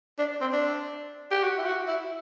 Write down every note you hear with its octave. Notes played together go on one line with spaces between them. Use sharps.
D4
C4
D4
G4
F#4
E4
F#4
E4